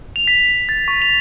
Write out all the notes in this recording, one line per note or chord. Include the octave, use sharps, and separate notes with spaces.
F7
B6
A6
C#6
F7